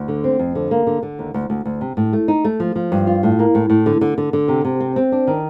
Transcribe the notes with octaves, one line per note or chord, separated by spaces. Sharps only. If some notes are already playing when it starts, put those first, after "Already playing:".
Already playing: D2
D3
C4
F2
D3
A#3
D3
D3
D#2
D2
D2
D2
C3
A2
A3
D#4
A3
F3
F3
G2
F4
A2
A#3
A2
A2
D3
D3
D3
D3
C3
C3
C4
C4
D4
D#3